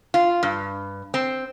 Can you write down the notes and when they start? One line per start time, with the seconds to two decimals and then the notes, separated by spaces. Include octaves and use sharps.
0.14 F4
0.43 G2
1.14 C4